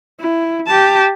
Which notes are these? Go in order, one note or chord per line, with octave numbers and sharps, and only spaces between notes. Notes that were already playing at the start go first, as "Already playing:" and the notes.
E4
G4 A5